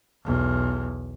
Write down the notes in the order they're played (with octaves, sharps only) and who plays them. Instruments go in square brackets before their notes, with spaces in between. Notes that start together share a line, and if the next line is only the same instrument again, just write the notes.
[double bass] B1 E2